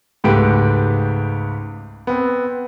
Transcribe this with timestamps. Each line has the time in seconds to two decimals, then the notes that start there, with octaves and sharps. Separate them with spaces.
0.24 C#2 G#2 A3 G4 B4 D7
2.07 B3 C4